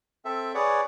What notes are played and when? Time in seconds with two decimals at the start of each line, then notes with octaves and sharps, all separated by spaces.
0.25 C4 A4 E5
0.54 G#4 B4 C#5 D5 F#5